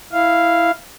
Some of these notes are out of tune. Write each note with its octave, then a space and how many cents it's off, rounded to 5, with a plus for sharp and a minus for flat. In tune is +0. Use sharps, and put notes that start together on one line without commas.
E4 +0 F5 -10